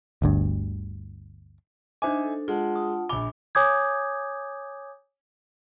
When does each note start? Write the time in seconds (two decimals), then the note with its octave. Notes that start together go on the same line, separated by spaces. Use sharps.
0.22 G1 D2 G2
2.02 D4 D#4 C5 E5 G#5 D6
2.24 A4
2.48 G#3 F4 F#5 A5
2.76 D#6
3.09 A#1 G#5 B5 D6 G7
3.55 C#5 G#5 D6 D#6 G6 G#6